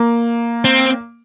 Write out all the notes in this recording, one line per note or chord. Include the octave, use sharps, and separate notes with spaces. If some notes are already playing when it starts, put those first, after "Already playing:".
Already playing: A#3
C4